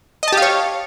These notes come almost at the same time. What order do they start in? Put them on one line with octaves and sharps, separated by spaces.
D#5 A5 G4 F5 C#5